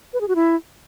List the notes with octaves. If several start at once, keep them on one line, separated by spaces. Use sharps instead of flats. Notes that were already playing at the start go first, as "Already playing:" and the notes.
B4
G#4
F#4
E4